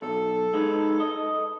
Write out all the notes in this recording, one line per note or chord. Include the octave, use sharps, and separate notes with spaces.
B1 A4
G#3 D#4 B4
D#5